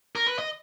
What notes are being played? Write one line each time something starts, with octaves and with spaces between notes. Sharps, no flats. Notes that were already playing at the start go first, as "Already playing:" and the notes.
A#4
B4
D#5